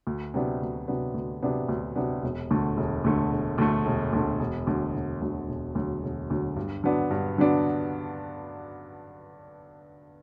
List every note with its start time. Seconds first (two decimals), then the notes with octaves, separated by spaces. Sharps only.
0.07 D2
0.34 C3 F#3 B3 D4
0.61 D2
0.88 C3 F#3 B3 D4
1.14 D2
1.43 C3 F#3 B3 D4
1.69 D2
1.96 C3 F#3 B3 D4
2.23 E1
2.51 D2 D3 A3
2.77 E1
3.04 D2 D3 A3
3.31 E1
3.58 D2 D3 A3
3.86 E1
4.13 D2 D3 A3
4.39 E1
4.67 D2 D3 F#3
4.94 E1
5.21 D2 D3 F#3
5.48 E1
5.75 D2 D3 F#3
6.03 E1
6.30 D2 D3 F#3
6.56 G2
6.84 D3 F#3 B3 D4
7.11 G2
7.38 D3 F#3 B3 D4